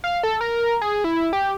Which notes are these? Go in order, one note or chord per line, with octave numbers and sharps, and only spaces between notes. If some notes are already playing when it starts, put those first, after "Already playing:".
F5
A4
A#4
G#4
E4
G4